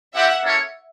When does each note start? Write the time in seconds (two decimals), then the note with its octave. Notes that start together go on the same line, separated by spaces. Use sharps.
0.15 C4 E4 G4 E5 F#5
0.44 A#3 C#4 E4 A4 C#5